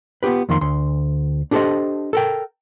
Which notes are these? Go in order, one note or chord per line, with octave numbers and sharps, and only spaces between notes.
B3 F4 G4 B4
F2 D#3 A#3 C6
D2 C6
D4 G4 A4 B4 C5 D#5
A4 A#4 G5